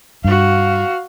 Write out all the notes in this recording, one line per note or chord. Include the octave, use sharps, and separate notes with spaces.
G2 F#4 F5